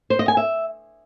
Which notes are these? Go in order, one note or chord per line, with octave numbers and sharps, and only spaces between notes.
C5
D#5
G#5
E5